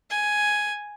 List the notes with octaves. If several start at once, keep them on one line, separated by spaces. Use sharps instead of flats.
G#5